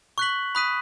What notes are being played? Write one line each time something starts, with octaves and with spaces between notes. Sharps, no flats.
C#6 F#6 B6 F#7
B5 D#6 F#6 B6 D#7